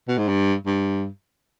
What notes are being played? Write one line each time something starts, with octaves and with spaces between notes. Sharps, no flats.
B2
G#2
G2
G2